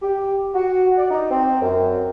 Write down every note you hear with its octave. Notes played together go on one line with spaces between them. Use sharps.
G4
F#4
D5
D#4
C4
F#2